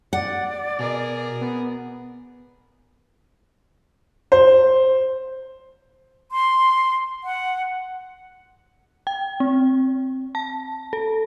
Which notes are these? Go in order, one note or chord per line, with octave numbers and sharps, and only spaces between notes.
D5 F#5
B2 G#4 A#4
B3
C5
C6
F#5
G5
C4
A5
A4